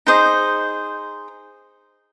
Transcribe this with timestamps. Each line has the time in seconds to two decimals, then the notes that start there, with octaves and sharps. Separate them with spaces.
0.07 D#4 G#4 C5 D#5